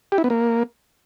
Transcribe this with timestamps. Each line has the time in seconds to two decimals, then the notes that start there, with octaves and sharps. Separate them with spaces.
0.12 G4
0.18 E4
0.24 B3
0.30 A#3